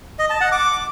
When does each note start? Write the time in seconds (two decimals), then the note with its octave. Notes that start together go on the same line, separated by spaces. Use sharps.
0.19 D#5
0.30 A5
0.41 F#5
0.52 D6